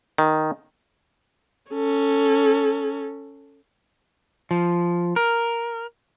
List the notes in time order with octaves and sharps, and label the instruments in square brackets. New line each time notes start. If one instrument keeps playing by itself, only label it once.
[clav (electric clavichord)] D#3
[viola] C#4 A4
[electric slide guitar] F3
A#4